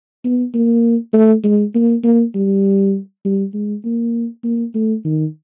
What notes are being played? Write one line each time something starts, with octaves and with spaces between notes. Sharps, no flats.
B3
A#3
A3
G#3
A#3
A#3
G3
G3
G#3
A#3
A#3
A3
D#3